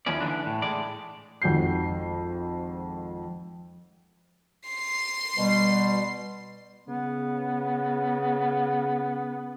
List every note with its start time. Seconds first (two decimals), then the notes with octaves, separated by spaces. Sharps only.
0.06 D#2 E3 F3 C#4 D5
0.20 D3 E3 G3 G#3 D4
0.46 A2
0.62 A2 G#3 D5
1.42 G#1 F2 G#2 F#4 G6 C7
4.68 C6 C7
5.37 B2 G3
6.88 C#3 B3